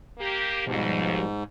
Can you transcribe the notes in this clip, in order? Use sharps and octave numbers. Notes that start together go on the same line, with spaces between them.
A#3 G4
D#2 G#2 B2 F3 G3